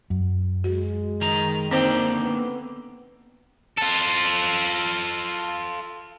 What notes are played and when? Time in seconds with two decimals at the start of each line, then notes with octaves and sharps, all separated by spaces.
0.10 F#2
0.64 G#3 F#4
1.21 D#3 A#5
1.71 D3 A#3 C4 D#4 C5 G5
2.23 B3
3.77 F4 A4